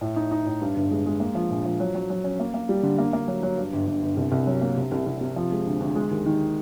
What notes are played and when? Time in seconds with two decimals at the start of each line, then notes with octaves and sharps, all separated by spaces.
0.01 A2
0.16 D#4
0.31 D#4
0.46 A2
0.61 G2
0.76 G1
0.91 G#3
1.06 G#3
1.20 A#3
1.35 F3
1.51 A#1
1.65 F3
1.80 F#3
1.95 F#3
2.10 F#3
2.24 C#4
2.40 A#3
2.54 A#3
2.69 G3
2.83 D3
2.98 A#3
3.13 A#3
3.28 F#3
3.43 F#3
3.58 G2
3.73 G1
3.87 G1
4.03 G1
4.17 C2
4.32 C2
4.47 F#3
4.61 A#3
4.77 C3
4.92 C2
5.06 C2
5.21 C3
5.36 F3
5.52 G#3
5.65 D2
5.80 D2
5.96 G#3
6.11 D#2
6.26 D#3